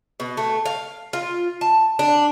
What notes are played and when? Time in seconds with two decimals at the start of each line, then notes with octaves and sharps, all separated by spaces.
0.20 B2
0.37 A3
0.65 F5
1.13 F4
1.61 A5
1.99 D4